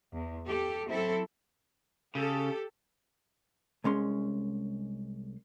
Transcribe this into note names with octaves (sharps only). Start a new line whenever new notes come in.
E2
G4 A4
F#3 C4 E4 A4
C#3 G4 A4
C2 G#3 C#4 C6